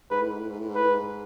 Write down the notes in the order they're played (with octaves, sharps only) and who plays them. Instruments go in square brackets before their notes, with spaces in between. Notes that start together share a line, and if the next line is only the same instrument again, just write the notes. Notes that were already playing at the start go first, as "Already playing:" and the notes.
[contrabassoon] G#2 [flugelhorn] B4
[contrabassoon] A2
G#2
A2
G#2
A2
G#2
[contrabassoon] A2 [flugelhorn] B4
[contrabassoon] G#2